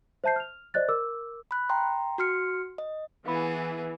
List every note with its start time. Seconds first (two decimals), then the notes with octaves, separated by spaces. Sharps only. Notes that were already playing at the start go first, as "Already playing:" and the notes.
0.24 C5 E5 A5 G6 C7
0.36 F6 F7
0.74 C5 D5 D#5 F#6 A6
0.88 A#4 D6 E6
1.51 B5 F#6
1.69 G5 A#5 C6
2.18 F#4 C6 F6 C#7
2.78 D#5
3.26 E3 B3 G#4 F5 B5